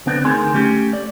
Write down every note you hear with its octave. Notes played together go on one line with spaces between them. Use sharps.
D3 B3 C4 D4
D2 D#3 G#4 C6
A3 C#4 G4
D5